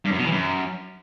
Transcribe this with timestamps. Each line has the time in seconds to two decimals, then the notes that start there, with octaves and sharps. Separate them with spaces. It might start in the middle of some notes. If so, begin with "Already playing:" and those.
0.05 G2
0.12 F#2
0.18 B2
0.25 E3
0.32 F#2